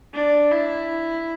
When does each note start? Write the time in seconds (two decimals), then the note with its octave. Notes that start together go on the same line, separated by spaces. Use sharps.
0.14 D4
0.51 E4